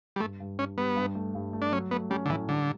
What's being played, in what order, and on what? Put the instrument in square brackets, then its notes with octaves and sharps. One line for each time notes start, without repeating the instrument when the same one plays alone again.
[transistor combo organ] G3
[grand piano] G2 [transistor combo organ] A3
[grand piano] G2
[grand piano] G2 [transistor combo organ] C#4
[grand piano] G3 [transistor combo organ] B3
[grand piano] G2
A3
G2
A3
[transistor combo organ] D4
[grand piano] F#3 [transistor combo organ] C#4
[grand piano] A3 [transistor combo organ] B3
[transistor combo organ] G3 [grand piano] C#4
[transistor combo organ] D3
[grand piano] A2 [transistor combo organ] E3
[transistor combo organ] D3 [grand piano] G3